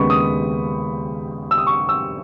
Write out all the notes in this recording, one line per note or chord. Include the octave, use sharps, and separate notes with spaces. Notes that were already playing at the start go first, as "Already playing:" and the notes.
Already playing: D#2 C#3 G#3 B3 B5 C#6
D#6
E6
D#6
C#6
E6